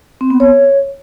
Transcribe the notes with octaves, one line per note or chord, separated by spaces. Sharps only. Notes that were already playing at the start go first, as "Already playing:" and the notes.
C4
B3
C#5